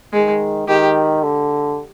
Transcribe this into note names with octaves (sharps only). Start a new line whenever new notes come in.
D#3 G#3
D#3 G4
D3